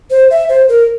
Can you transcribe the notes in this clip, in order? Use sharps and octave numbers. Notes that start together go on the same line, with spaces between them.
C5
E5
C5
A#4